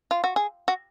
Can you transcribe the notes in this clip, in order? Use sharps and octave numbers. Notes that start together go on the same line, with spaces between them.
F4
F#4
G#4
F#4